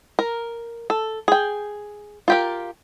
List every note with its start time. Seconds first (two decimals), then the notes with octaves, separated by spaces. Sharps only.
0.19 A#4
0.90 A4
1.28 G#4 G5
2.28 F4 G4 A#4